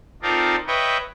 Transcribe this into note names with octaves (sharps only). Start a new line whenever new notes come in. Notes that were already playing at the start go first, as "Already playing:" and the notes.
C4 D#4 F4 A4 A#4 D5
B4 C#5 D#5 E5 G5